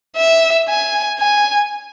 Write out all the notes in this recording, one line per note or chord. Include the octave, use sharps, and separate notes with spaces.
E5
G#5
G#5